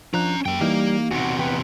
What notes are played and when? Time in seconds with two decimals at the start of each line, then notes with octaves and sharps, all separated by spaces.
0.14 F3 C#4 D4 A#5 F#6
0.46 F#2 A#3 G5
0.61 E3 G3 A#3 D#4 G4
1.11 E2 C3 F#4
1.39 B3 B4 G5